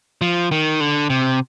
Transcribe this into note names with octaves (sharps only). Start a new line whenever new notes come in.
F3
D#3
D3
C3